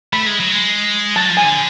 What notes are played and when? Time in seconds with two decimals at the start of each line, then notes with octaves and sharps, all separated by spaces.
0.13 A3 B5
0.26 G#3
0.40 F#3
0.52 G#3
1.16 F#3 A5
1.30 F3
1.37 G#5
1.43 D3